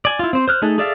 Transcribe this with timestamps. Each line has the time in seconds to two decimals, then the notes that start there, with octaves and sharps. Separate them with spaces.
0.05 D5 G#5
0.19 E4 F4
0.33 C4 C5
0.48 C5 F6 F#6
0.62 A3 D#4 G#4 A4
0.78 G#4 A4 D5 E5 F5